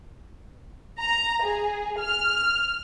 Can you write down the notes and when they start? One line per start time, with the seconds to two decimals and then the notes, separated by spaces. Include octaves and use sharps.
0.99 A#5
1.43 G#4
1.99 F6